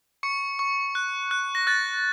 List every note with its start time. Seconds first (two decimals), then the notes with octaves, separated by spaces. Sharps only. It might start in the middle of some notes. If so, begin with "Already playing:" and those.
0.23 C#6 C#7
0.59 C#6
0.95 F#6
1.31 F#6
1.55 A#6
1.67 F#6 A6